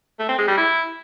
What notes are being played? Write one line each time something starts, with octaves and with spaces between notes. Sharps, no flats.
A3
C4
G#3
G3
E4